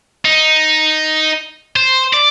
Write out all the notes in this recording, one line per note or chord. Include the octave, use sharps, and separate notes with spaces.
D#4
C5
D5